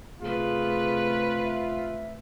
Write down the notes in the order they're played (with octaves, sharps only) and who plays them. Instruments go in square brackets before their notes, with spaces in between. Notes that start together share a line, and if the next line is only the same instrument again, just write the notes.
[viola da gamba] C3 A3 B4 [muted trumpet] F4 [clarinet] G#4
[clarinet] E5